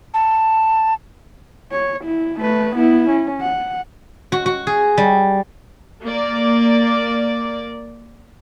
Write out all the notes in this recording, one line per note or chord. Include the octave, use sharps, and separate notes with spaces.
A5
C#5
E4
A3 B4
B3 E4
C#4
F#5
F#4
F#4
G#4
G3
A#3 D5